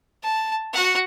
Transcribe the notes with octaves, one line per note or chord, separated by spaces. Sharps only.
A5
F#4 F#5